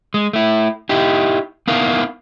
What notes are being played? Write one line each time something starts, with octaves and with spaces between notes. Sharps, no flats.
G#3
A3 E4
D#4 E4 G4
B3 D#4 E4 A#4 F5